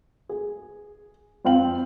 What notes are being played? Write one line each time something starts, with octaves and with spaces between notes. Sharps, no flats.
G#4
F2 F3 C4 F5 G5 F#7